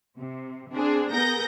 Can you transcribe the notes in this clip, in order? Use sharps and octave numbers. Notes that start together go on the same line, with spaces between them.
C3
C4 D4 G#4
B3 G#4 A#4 G6 A#6